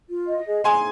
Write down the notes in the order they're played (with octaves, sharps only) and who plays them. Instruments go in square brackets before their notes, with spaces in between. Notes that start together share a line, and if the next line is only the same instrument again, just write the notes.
[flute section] F4
D#5
G#4
[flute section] G#4 [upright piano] G#5 C6